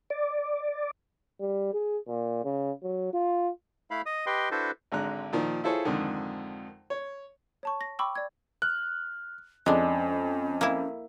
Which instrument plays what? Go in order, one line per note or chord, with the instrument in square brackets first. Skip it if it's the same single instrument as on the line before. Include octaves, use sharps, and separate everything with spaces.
[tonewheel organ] D5
[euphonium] G3
G#4
A#2
C#3
F#3
F4
[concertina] A3 E4 F5 B5
D#5 D#6
G4 B4 D#5 G5 C6
D4 E4 F#4 A4 B4 C5
[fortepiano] G#1 D3 G#3 A#5 F#6
A#2 D#3 F3
E4 F4 G#4 A4 C5 C#5
F2 G#2 D3 D#3
C#5
[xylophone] C#5 A5 C#6
A#6
G5 B5 C#6 D6 E6
D5 G#6
[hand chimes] F6 [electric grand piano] F#6
[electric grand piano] F2 [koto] G#3 D4 [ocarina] C#4 [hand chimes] D#5 G#5
[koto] A#3 E4